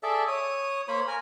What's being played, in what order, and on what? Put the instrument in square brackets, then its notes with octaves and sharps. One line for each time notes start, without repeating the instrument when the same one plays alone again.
[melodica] G#4 A4 D5 E5
C#5 D#6
A#3 C5 C#5 B5
A#4 G#5